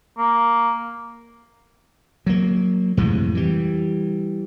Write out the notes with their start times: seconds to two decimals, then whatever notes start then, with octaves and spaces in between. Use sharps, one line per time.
0.18 A#3
2.26 F#3 A#3
2.97 F2 A2 C3 G#3
3.35 E3 G3